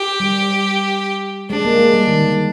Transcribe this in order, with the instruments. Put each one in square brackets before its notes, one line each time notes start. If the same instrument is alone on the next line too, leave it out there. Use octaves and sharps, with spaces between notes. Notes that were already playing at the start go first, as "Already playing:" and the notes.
Already playing: [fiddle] G4
[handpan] G3
[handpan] G#3 [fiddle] D4
[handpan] A#3
G#3
G3
D#3
D3